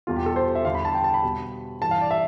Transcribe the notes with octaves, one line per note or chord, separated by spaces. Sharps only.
E2 B2 G3 F4
G4
A4
C5
E5
E2 D3 G3 F5
B5
A5
G5
A5
B5
B2 G3
G2 E3 G3 A5
F5
D5
E5